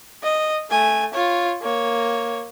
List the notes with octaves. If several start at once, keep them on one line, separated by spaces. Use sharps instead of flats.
D#5
A3 G#5
F4 C#5
A#3 C#5